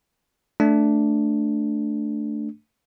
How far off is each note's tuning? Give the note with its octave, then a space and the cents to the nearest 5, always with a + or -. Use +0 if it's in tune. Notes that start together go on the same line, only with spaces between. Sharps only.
A3 +0 D4 +0